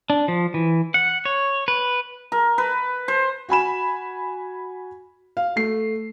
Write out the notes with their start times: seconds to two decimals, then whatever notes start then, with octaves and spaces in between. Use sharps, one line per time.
0.10 D4
0.28 F3
0.54 E3
0.94 F#5
1.25 C#5
1.68 B4
2.32 A#4
2.58 B4
3.08 C5
3.49 F#4 G#5 B5 E7
5.37 F5
5.56 A3 C7